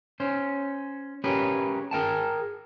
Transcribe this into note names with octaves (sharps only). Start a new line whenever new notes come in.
C#4 C5
C#4 G4 G#4 A#4 B4
G#4 A#4 G5 A5